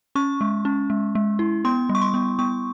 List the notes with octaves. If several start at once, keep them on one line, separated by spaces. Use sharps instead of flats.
C#4 C#6
G#3
C#4
G#3
G#3
E4
B3 C6
G3
C#6
C6
B3
B3 C#6